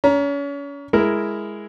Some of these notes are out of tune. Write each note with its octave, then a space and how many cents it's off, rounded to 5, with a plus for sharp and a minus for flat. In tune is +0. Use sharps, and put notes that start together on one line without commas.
C#4 +35 A#5 +10
G#3 +0 E4 +5 A#4 +0